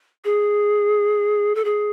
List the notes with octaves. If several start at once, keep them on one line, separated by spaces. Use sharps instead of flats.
G#4
A4
G#4